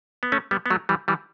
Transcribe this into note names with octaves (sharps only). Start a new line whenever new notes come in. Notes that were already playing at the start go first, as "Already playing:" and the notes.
B3
A3 C#4
G3 B3
B3
F#3 A3
E3 G3
E3 G3